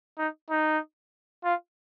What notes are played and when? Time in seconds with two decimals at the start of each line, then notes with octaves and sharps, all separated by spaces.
0.18 D#4
0.50 D#4
1.44 F4